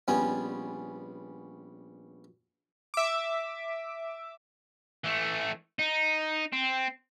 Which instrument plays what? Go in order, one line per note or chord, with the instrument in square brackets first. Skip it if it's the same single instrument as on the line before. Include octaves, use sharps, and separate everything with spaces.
[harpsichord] A#1 G3 B3 C#4 G#5
[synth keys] E5 D6
[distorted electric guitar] E3 A3
D#4
C4